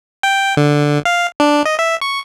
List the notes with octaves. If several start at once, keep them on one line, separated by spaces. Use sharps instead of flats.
G5
D3
F5
D4
D#5
E5
C#6